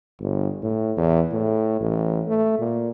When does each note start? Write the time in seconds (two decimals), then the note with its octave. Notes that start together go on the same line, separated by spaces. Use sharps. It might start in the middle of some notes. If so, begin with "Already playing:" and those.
0.20 G1
0.63 A2
0.97 E2
1.33 A2
1.81 A1
2.28 A3
2.59 A#2